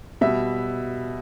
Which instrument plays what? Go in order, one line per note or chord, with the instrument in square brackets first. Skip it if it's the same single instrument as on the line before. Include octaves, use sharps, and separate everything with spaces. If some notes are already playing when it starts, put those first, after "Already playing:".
[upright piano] B2 G3 E5